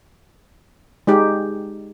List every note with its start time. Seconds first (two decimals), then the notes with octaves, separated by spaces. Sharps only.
1.07 G#3 D#4 G4